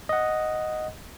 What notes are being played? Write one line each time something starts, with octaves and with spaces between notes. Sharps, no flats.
D#5 F#5